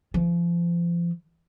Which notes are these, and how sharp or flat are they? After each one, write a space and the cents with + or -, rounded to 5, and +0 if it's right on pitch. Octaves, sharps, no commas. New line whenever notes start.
F3 -30